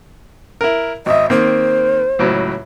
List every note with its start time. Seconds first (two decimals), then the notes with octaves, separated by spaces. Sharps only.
0.61 E4 A#4
1.06 G#1 D#5 E5
1.30 D#3 A#3 C4 C5
2.19 C#2 A2 F#3